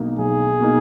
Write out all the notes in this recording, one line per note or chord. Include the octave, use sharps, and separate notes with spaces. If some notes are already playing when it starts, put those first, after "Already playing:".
Already playing: B1 B2 A#3 D#4
B1 G#4
B2 A#3 D#4